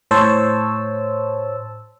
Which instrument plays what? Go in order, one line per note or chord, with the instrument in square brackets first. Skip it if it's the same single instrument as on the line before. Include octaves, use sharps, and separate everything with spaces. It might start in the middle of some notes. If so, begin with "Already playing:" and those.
[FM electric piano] A2 C5 C#5 A5 E6